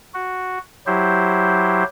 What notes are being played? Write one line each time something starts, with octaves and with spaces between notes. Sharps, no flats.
F#4
F#3 E4 G4 C5